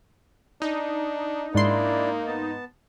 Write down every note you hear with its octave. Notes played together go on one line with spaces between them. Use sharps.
D4 D#4
G#2 A#3 D4 E4 D5 C6
B3 A5